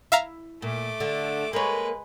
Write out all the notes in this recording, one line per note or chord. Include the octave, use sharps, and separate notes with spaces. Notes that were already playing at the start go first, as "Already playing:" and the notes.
E4 E5 F5 A#5
A#2 A3 D6
D3
G#3 A#3 B4 C#5